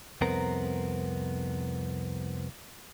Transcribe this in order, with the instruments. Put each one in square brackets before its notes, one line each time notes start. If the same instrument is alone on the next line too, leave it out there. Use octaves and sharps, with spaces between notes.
[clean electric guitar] C2 F2 B3 C4 A#4 A#5